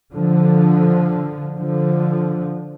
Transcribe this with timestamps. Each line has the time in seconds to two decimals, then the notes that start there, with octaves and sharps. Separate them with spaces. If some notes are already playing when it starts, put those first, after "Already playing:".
0.13 D3 F3
1.57 D3 F3